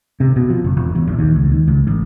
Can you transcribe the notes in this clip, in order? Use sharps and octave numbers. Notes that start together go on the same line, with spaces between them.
C3
B2
F3
F#1
E1
E2
A#1
D#2
C#2
D#2
C#2
A1